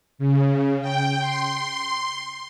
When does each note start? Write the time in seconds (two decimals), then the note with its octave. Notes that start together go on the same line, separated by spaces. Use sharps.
0.19 C#3
0.81 G5
1.21 C6